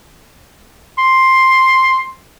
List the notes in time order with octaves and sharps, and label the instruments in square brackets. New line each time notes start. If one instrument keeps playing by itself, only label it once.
[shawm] C6